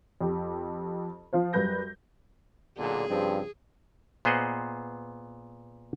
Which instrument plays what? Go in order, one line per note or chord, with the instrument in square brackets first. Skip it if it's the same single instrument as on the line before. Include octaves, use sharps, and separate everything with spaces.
[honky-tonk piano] F2 G4
F3 F4 C5
F#2 G3 B4 G6 A#6
[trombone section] B1 A#2 D3 [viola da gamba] G#4
[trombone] G2 [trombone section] C#3 F3 C4
[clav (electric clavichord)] A#2 B3 G#4 C5 D#5 F#5